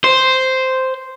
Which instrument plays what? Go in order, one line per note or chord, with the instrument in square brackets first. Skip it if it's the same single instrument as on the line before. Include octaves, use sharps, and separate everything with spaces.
[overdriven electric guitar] C5